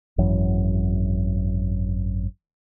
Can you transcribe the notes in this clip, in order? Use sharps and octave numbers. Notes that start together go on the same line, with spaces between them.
G#1 F#2 E3 F#3